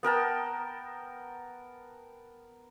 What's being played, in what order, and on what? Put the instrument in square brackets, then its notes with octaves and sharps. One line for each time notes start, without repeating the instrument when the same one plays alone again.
[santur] B3 A#4 G5 A5